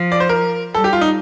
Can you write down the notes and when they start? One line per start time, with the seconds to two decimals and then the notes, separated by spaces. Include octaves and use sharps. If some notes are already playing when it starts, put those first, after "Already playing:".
Already playing: F3
0.12 D5
0.20 C5
0.29 A#4
0.75 G3 A4
0.84 G4
0.93 F4
1.01 D#4